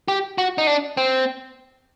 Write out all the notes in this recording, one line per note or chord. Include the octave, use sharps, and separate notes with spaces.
G4
F#4
D#4
D4
C4